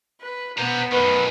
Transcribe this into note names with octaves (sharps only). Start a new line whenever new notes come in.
B4
B3 C5 A#5
F#2 D#3 B4